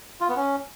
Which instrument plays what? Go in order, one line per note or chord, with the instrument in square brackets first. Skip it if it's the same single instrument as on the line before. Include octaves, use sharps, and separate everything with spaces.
[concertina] F4
B3
C#4